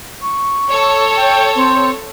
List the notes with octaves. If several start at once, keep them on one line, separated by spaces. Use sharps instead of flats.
C#6
A4 C#5
G5
C4